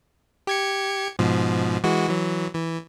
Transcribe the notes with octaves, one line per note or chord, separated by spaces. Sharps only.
G4 G#6 C#7
G#2 B2 F3
E3 G#3 F#4
E3 F#3
E3